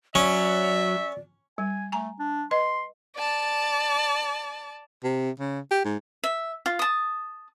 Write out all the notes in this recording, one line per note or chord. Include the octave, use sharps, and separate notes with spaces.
F#3 C#4 D5 E5
G3 G#5
A3 G#5 A#5
D4
B4 D#5 C6
D5 A5
C3
C#3
G4
G#2
E5
F4
A5 D#6